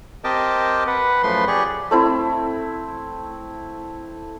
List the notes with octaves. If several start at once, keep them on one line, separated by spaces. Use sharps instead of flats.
C4 G4 A#4 D#5 G5 A5
B4 F#5
F#2 F3 A3 B4 C6
G4 G#4 D5 C#6
A3 C4 E4